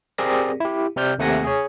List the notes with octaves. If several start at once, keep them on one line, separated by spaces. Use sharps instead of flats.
C4 G4 G#4 A#4 D5 A#6
E4 G4
C3 C4 D5 F6 G6
D#2 C3 A3 F#5 G#5 A#6
G#4 C#5